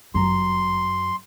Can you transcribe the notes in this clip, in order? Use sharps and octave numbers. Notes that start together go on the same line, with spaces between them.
G1 F#2 A#5 C6